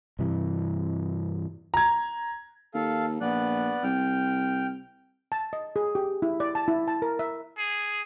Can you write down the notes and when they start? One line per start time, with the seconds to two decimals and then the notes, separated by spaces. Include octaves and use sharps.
0.19 G2 C3 E3
1.74 A#5 G#6
2.74 D#2 A4 F5
3.21 A#1 B3 D5 F#6
3.84 C2 G5 F6
5.32 A5
5.53 D#5
5.76 G#4
5.95 G4
6.22 E4
6.40 D5
6.55 A5
6.68 E4
6.88 A5
7.02 A#4
7.19 E5
7.58 G#4